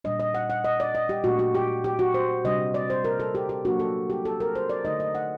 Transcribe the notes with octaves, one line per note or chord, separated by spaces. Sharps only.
A#2 G3 D4 D#5
D#5
F#5
F#5
D#5
D5
D#5
G4
A#2 A3 D4 F#4
F#4
G4
G4
F#4
C5
C3 G3 D4 D#5
D5
C5
A#4
A4
G4
G4
F#3 A#3 D4 F#4
A4
G4
A4
A#4
C5
D5
D3 A3 D#4 D#5
D#5
F#5